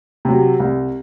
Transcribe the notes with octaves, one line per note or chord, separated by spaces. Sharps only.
C3 F#3
C2